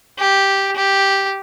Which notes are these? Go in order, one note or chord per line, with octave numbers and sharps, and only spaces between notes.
G4
G4